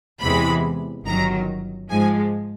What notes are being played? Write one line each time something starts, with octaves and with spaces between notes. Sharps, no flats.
E2 C3 E3 G#3 B5
G1 F#2 D#3 F#3 A#5
G#2 F3 G#3 G#5